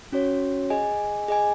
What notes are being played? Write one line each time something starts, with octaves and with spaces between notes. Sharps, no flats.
C#4 F#4 C#5
G#4 D#5 G#5
G#4 D#5 G#5